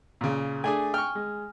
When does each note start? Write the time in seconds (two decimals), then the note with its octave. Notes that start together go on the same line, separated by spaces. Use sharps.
0.21 A#2 C#3
0.64 A3 D4 G#4 G#5
0.94 G5 C#6 F6
1.15 G#3